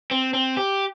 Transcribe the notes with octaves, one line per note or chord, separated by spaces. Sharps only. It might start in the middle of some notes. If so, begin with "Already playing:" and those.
C4
C4
G4